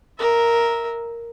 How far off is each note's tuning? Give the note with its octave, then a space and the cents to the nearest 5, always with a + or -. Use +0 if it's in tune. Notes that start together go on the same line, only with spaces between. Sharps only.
A#4 +0 E5 -15